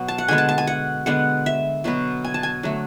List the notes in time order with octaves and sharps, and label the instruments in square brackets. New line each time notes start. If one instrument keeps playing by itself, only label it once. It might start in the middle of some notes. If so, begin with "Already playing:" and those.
Already playing: [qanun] B2 F#3 B3
A5
F#5
D3 G#3 B3 G#5
A5
A5
G#5
F#5
D3 G#3 B3 F#5
E5
B2 F#3 B3
G#5
A5
G#5
D3 F#3 A3